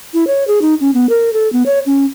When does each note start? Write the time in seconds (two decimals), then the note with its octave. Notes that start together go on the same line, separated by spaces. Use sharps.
0.14 E4
0.27 C#5
0.48 G#4
0.62 D#4
0.81 C#4
0.94 B3
1.09 A#4
1.33 A4
1.53 B3
1.66 C#5
1.86 C#4